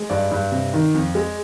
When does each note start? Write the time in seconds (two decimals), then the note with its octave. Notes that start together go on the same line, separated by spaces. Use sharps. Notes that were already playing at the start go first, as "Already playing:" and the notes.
Already playing: G#3
0.10 G2 D5
0.31 G2
0.52 C3
0.73 D#3
0.94 F2
1.15 G#3